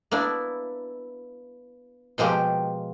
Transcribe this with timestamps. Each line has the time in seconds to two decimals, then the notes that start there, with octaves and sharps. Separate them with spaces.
0.11 A#3 B3 D4 E4
2.18 B2 F3 G#3 A#3 G4 C6